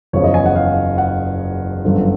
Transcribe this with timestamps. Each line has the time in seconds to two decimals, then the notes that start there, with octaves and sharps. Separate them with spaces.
0.13 F#1 E2 C#3 F3 C#5
0.24 D#5
0.34 G#5
0.46 F#5
0.56 F5
0.98 F#5
1.84 G1 F#2 D3 F3